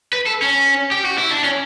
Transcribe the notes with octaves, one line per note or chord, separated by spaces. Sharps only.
B4
A4
C#4
G4
F#4
E4
D4
C#4